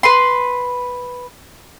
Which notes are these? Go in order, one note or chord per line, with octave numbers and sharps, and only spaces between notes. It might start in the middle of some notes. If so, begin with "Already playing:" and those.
B4 B5 C6